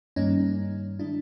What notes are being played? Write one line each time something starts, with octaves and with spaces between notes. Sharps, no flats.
G2 D#3 G3 A#3 C#4 D#4
D#3 G#3 D4 E4